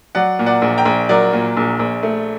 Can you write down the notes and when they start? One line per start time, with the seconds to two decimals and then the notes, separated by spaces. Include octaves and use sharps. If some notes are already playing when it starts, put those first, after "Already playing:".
0.15 F#3 D5 F#5
0.39 A#2
0.46 D5 F#5
0.62 A#1
0.78 G5 A#5
0.86 A#1
1.09 F#3 A#4 D5
1.33 A#2
1.57 A#1
1.79 A#1
2.03 A3